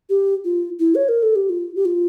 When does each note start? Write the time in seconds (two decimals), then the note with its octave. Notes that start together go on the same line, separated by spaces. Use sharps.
0.10 G4
0.45 F4
0.80 E4
0.95 C#5
1.09 A#4
1.23 A4
1.36 G4
1.50 F4
1.76 G4
1.85 F4